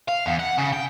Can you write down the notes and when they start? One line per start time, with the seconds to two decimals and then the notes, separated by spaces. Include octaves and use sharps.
0.09 F5
0.26 E2
0.39 F#5
0.58 C#3
0.73 G5